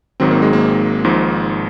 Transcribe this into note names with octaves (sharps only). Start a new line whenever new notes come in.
G#1 G#2 D#3 F#3 C4
A#3
G#3
A#3
G#1 G#2 F3